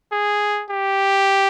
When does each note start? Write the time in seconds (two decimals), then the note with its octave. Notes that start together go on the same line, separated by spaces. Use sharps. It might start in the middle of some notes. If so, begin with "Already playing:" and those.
0.12 G#4
0.70 G4